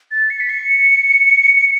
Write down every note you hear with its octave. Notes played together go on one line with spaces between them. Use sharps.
A6
C#7
B6
C#7